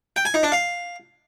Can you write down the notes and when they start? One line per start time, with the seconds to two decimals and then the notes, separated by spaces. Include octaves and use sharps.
0.16 G5
0.25 G#5
0.34 D#4
0.43 D4
0.52 F5